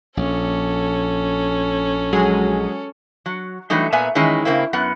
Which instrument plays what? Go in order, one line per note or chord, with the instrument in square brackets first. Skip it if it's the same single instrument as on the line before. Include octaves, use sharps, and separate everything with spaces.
[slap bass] A#1 [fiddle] C#4 A4
[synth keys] F#3 G#3 G#4
[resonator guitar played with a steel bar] F#3
E3 F#3 G3 A3 D#4
A#2 B3 E5 G#5 A#5
D#3 E3 G#3 C#4 D#4 E4
C#3 A#3 C4 E4
F#2 B3 F#5